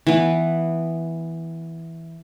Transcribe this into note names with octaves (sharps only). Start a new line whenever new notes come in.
E3 B3